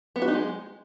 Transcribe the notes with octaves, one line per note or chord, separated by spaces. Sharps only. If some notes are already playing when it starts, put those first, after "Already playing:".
B3
F#4
D#4
G#3